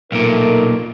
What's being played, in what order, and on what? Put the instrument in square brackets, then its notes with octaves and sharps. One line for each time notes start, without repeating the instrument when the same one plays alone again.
[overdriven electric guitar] B1 A#2 [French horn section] A3 D#4 A#4